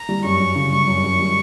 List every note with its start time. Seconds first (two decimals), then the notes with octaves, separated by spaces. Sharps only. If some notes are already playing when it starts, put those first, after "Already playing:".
Already playing: A#5
0.09 G3
0.24 F#2 C#6
0.40 F#2
0.55 C#3
0.71 G3 C#6
0.88 F#2
1.03 F#2
1.19 G3